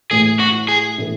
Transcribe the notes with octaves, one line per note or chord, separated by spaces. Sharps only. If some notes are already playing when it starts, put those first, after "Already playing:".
A2 E3 A3 G#4
F#4
G#4
A2 E3 A3